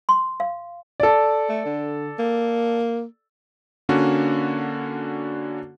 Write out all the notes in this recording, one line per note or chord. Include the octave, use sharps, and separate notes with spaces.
C6
F5
A4 D5
A3
D3
A#3
D3 A#3 C#4 D4 F#4